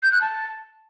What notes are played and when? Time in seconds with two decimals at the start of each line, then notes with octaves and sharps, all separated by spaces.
0.03 G6
0.12 F#6
0.21 A5